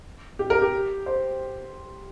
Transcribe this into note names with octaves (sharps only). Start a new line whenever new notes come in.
G4
A#4
G4
C5